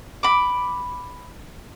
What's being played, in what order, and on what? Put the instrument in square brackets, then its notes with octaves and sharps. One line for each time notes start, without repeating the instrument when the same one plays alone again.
[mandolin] B5 D6